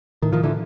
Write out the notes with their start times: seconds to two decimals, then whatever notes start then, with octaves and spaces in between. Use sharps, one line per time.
0.22 A2 D#3
0.33 D#3 F3
0.43 D3 E3